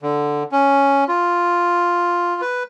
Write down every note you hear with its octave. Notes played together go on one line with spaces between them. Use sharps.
D3
C#4
F4
B4